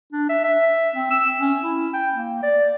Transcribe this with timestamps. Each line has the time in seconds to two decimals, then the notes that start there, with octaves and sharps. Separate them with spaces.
0.13 D4
0.29 E5
0.44 E5
0.94 C4
1.10 E6
1.40 C#4
1.62 E4
1.93 G5
2.15 A#3
2.43 D5